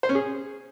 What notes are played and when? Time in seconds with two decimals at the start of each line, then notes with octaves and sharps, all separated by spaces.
0.03 C5
0.09 C#4
0.15 G#4